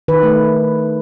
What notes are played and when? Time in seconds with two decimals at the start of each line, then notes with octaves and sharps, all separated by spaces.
0.08 D#3 B4
0.23 A3